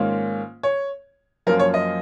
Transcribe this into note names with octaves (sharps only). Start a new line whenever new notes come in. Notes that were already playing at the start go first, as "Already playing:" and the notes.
Already playing: G#2 D#3 A#3 C#4 F4
C#5
F#2 F3 A#3 C#4 F4 A#4
C#5
D#5